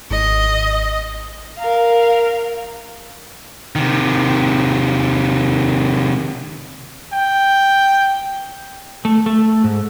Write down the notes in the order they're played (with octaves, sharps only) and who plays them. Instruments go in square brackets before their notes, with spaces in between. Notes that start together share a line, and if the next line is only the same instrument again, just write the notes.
[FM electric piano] G#1 [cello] D#5
[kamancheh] A#4 F5
[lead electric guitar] C3 D#3
[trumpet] G5
[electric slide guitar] A3
A3
G#2